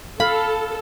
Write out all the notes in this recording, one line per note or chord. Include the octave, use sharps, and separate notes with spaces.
A4 F5 B5